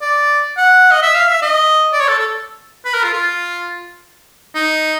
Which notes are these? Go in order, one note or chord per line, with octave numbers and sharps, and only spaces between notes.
D5
F#5
D#5
E5
F5
E5
D#5
D5
C#5
A4
A4
B4
A#4
F4
F4
D#4